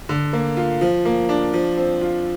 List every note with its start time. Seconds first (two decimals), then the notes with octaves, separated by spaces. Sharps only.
0.09 D3
0.33 A#3
0.57 F4
0.81 F3
1.05 A#3
1.29 D4
1.53 F3
1.77 C4
2.01 F4